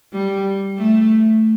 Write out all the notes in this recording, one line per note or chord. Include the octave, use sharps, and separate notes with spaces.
G3
A3